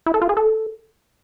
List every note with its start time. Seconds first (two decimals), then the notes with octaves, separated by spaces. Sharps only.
0.06 E4
0.14 A4
0.22 F4
0.29 G#4
0.37 A4